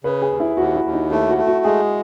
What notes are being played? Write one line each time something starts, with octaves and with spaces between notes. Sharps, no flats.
C#3 B4
G#4
D#2
E4
D#2 F#4
E4
D#2
D#4
A3 E4
F#4
A3
F#4
G#3 G#4